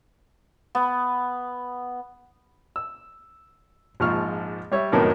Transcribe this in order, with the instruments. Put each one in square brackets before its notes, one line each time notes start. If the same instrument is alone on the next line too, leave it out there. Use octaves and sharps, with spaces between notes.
[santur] B3
[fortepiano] E6
A#1 G#2 F3 C#6 F6
G3 C#5 E5
F2 A2 D#3 F#3 A#3 B3